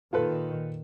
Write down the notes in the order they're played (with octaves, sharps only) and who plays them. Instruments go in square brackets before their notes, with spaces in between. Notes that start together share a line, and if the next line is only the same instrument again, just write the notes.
[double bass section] A#2 D#3 [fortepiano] F4 A4 B4